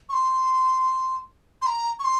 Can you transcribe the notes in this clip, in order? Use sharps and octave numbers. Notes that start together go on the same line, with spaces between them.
C#6
C6
C6
A#5
C#6
C6